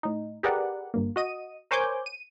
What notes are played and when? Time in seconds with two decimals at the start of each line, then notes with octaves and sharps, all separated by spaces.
0.03 A2 D#4
0.43 G4 G#4 A#4 B4 D5 F#5
0.94 G1 G2 A#3
1.16 F#4 D#5 D#7
1.71 A#4 C5 C#5 G#5 D6 G6
2.06 D#7